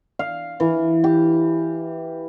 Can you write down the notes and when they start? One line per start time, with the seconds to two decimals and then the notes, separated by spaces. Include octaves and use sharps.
0.19 F5
0.60 E3
1.04 G4